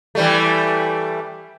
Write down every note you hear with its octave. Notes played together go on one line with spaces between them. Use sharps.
E3 G3 A3